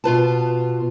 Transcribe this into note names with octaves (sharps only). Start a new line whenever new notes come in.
B2 F4 B4 A5